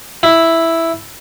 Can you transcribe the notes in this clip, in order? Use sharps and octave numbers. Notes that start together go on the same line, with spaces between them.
E4